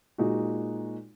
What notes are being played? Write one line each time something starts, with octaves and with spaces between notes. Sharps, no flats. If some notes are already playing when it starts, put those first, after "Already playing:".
A#2 G#3 D#4 F#4